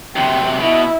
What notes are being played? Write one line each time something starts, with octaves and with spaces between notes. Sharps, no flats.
F#2 C3 G5
B2 E4